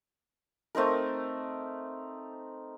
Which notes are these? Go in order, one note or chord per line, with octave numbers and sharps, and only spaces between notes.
A3 C4 D#4 A#4